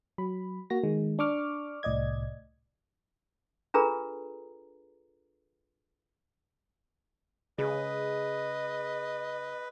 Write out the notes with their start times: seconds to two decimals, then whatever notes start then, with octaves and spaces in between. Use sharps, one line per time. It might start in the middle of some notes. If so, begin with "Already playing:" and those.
0.18 F#3 B5
0.70 A#3 F#4 A#6
0.84 D#3 G#3
1.19 D4 C#6 D6 F6
1.83 C2 A2 D5 D#5 G#6
3.74 D4 F4 G#4 A4 B4 A#5
7.59 C#3 G#4 B4 D#5